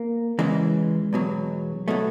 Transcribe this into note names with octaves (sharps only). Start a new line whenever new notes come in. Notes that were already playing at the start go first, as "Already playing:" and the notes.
Already playing: A#3
E2 C#3 E3 G#3
E2 B2 F#3
B2 F#3 A3